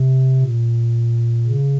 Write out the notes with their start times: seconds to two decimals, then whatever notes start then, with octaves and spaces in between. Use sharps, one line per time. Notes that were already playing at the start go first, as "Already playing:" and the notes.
Already playing: C3
0.41 A#2
1.47 C#3